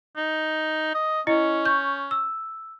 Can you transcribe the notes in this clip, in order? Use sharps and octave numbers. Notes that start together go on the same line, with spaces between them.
D#4
D#5
C#4 E4 D#5 C#7
C#6 G6
E6